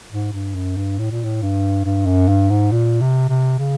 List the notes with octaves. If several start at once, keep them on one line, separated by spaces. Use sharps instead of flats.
G#2
G2
F#2
G2
A2
A#2
A2
G2
G2
F#2
G2
G#2
A#2
C3
C3
C#3